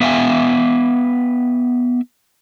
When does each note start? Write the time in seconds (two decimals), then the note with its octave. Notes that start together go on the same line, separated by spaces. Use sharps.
0.01 B3 E5 F5 G5 G#5